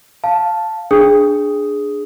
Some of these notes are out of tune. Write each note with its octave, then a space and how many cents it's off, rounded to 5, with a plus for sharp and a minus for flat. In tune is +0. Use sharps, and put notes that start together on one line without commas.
F5 +0 A5 +0
D4 +0 G#4 +0 D#6 +5